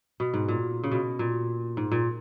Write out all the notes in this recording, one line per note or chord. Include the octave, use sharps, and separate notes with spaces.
B2
G#2
A#2
C#3
B2
A#2
G#2
A#2